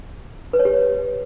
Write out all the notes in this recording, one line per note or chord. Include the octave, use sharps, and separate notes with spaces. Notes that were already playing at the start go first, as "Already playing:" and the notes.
B4
C#5
G4